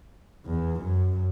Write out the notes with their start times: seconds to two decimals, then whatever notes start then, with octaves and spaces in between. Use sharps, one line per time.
0.46 E2
0.80 F#2